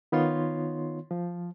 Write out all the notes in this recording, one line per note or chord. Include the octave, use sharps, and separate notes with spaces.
D#3 B3 D#4 F4 C#5 C6
F3